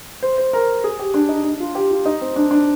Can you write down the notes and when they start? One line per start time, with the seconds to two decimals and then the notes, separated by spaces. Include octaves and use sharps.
0.23 C5
0.38 C5
0.53 A#4
0.84 G#4
0.99 G4
1.14 D4
1.29 D#4
1.44 D4
1.60 F4
1.75 G4
1.91 F4
2.05 D#4
2.21 C4
2.36 D4
2.51 D4